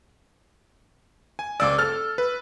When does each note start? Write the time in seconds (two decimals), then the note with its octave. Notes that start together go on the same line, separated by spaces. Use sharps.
1.39 G#5
1.60 C#2 D5 D6 E6
1.78 A4 F6 A6
2.18 B4